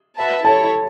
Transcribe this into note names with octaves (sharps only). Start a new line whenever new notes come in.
F#4 B4 E5 A5
E4 A4 C#5 A5